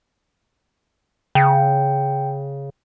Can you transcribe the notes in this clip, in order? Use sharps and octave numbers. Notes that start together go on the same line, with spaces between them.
C#3 G5